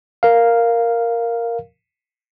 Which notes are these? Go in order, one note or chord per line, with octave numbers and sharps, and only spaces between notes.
A#4 F5